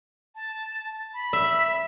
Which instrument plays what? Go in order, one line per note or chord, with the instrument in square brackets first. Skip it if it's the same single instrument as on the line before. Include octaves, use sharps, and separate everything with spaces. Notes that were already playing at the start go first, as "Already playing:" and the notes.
[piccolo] A5
B5
[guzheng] E5